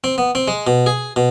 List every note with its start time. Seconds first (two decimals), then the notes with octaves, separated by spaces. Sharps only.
0.04 C4
0.18 B3
0.35 C4
0.48 G#3
0.67 B2
0.86 G#4
1.16 B2